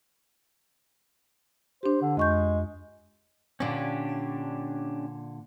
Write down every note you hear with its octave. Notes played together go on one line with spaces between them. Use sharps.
D4 G4 C5
D3
F2 G#3 C#6 G6
A#2 D3 C#4 D4 G4